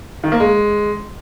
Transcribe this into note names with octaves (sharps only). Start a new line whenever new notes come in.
D#3
A#3
G#3